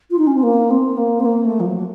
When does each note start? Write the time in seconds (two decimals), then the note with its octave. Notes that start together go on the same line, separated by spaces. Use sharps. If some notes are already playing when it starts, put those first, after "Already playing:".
0.10 F4
0.18 D#4
0.26 C#4
0.34 C4
0.42 A#3
0.70 C4
0.96 A#3
1.19 C4
1.25 A#3
1.44 A3
1.59 F3
1.65 F#3